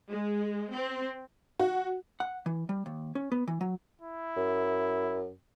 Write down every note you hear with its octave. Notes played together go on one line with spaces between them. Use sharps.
G#3
C4
F#4
F#5
E3
G3
D#2
C#4
B3
E3
F#3
E4
F#2